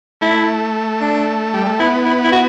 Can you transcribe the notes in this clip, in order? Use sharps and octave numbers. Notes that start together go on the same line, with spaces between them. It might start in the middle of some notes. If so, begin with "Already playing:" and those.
A3 E4
D4
G3
A3
B3 E4
E4
E4
F#4